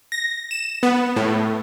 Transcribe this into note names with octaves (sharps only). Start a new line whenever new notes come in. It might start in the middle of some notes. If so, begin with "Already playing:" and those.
A#6
E7
B3
A2